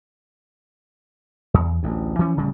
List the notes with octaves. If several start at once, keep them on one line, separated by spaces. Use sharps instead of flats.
E2
A1 D2
E3 F3 C#4
D1 C#3 G3